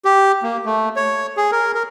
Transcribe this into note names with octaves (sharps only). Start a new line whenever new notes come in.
G4
A#3
A3
C#5
G#4
A#4
A#4